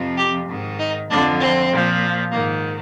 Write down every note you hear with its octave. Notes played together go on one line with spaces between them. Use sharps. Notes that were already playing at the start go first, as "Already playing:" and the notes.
Already playing: F2 C3 F3
G4
G#2 D#3
D#4
F2 D3 F3 D4
C4
A#2 F3
G#2 D#3 A#3